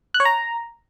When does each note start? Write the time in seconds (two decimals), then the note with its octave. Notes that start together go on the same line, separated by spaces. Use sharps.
0.14 F#6
0.20 C#5
0.25 A#5